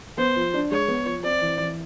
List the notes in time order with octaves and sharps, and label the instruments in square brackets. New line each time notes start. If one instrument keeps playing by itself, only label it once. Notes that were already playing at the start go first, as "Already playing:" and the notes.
[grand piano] B3 [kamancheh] C5
[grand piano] F3
D4
[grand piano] G#3 [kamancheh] C#5
[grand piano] B3
F3
[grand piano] C4 [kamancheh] D5
[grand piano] E3
E3